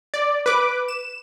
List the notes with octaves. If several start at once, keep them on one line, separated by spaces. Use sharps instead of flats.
D5
B4 D6
E7